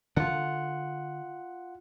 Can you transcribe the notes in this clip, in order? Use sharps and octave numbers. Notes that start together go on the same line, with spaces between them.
D3 D4 F4 F#5